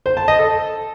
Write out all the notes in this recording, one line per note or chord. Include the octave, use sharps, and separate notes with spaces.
C5
A5
D#5
A4